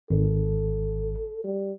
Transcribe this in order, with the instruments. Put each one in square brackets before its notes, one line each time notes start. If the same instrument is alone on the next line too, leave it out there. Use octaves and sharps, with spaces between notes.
[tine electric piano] G#1 [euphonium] A4
[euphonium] G3